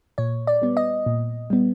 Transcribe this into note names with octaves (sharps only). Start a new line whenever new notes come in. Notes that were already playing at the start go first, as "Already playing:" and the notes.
A#2 C#5
D5
G3 B3
D#5
A#2
G3 B3